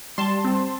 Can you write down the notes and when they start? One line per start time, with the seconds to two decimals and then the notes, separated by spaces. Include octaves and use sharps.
0.18 G3 A5 C6
0.45 C4